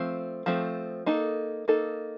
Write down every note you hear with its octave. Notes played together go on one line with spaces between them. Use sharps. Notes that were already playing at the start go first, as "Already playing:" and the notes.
Already playing: F3 A3 C4
F3 A3 C4
A#3 D#4 A4
A#3 D#4 A4